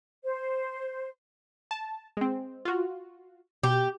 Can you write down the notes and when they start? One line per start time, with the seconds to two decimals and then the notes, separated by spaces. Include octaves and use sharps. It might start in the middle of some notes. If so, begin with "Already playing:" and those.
0.24 C5
1.71 A5
2.17 G#3 C4
2.65 F4 F#4
3.63 B2 G4